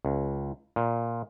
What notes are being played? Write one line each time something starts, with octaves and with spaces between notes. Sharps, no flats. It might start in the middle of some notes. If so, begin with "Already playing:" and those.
C#2
A#2